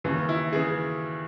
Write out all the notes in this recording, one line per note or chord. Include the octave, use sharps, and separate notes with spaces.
D#2 C#3 E3
E4
C#3 E3 G#4